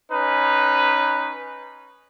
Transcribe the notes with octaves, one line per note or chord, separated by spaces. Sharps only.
C#4 D#4 B4